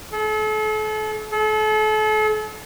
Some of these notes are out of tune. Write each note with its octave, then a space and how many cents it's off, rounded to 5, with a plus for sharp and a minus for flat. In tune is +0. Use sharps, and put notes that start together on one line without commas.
A4 -40
A4 -40